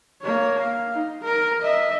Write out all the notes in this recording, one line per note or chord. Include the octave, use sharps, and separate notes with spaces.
A#3 C#5
F5
D#4
A#4
D#5 E5